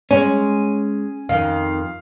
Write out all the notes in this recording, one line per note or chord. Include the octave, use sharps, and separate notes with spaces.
G#3 C#4 C#5
F2 D#3 F5